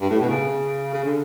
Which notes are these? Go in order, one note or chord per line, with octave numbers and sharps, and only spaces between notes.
G2
A2
B2
C#3
C#3
D3